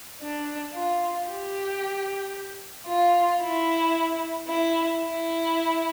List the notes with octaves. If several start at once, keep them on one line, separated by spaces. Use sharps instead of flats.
D4
F4
G4
F4
E4
E4
E4